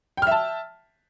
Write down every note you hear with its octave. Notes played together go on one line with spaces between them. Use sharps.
E5 G5 A5 F6